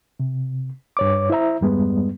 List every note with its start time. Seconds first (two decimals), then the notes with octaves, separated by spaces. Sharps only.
0.20 C3
0.97 G2 C#5 D6
1.30 E4 C5 E5 A#5
1.61 E2 G2 G3 G#3 B3